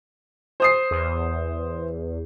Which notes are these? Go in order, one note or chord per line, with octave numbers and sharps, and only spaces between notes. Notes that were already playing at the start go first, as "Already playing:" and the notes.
C5 D#6 C7
E2